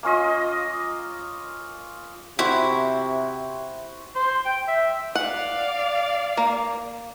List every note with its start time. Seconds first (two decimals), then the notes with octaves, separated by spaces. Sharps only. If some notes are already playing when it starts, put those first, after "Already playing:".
0.03 A#3 C#4 F4 D#5
2.39 C3 E4 F#4 C5 C6
4.15 C5
4.45 G5
4.68 E5
5.15 D5 F5 F#5
6.37 A#3